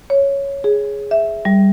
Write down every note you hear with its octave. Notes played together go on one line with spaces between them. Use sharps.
C#5
G#4
E5
G3